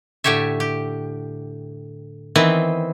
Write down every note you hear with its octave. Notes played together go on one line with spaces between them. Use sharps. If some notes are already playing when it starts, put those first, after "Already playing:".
A2 D3 G4 C#5 E5
G4
D#3 E3 B3 C4 E4